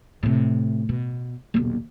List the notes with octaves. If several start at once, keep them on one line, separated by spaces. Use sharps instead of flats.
A2 C3
B2
D#1 B1